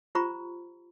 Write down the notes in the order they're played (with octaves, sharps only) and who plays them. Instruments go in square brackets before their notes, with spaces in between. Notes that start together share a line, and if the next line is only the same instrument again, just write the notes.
[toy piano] F4 G4 C5 A#5 B5 C#6